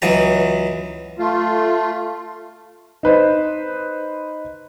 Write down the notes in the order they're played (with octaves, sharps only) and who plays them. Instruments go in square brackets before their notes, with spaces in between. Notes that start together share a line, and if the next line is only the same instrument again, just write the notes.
[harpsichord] C#2 E3 F#3 A#5
[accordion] A3 F4
[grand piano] D#4 B4 C5